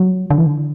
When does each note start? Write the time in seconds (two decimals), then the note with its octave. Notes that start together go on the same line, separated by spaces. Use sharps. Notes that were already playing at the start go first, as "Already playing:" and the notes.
Already playing: F#3
0.30 D3
0.38 E3
0.46 D3